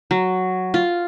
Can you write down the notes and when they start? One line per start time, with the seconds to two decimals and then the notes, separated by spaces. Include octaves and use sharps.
0.11 F#3
0.74 F4